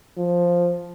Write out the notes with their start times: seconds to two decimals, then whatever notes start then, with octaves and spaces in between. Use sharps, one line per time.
0.17 F3